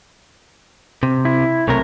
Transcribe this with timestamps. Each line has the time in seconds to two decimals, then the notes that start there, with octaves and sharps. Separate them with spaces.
1.03 C3
1.25 E4
1.68 B1 C3 A3 A#4 C#5